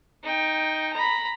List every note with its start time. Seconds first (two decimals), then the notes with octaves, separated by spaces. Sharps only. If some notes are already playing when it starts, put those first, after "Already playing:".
0.23 D#4 G5
0.93 A#5 B5